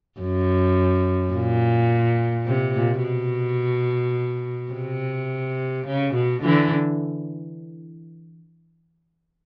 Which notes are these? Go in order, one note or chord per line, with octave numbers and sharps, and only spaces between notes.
F#2
A#2
C3
A#2
B2
C3
C#3
B2
D3 E3